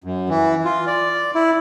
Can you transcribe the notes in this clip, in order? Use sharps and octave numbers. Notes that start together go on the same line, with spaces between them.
F#2
E3
F4
D5
E4